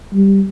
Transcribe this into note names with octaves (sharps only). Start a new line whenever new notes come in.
G3